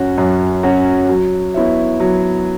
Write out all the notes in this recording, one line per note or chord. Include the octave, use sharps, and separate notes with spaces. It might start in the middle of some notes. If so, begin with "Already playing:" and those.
Already playing: F#2 F#3 C#4 F#4
F#2
F#3 C#4 F#4
F#3
B3 E4 C#5 E5
F#3